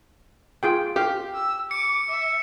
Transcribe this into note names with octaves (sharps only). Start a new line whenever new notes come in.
F4 G#4 G5
G4 F5
E6
D6 C#7
E5